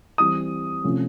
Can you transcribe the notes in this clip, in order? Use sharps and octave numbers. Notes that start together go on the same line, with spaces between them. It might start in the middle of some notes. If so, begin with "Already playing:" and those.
E3 G3 C4 D#6
C3 F3 A3 C#4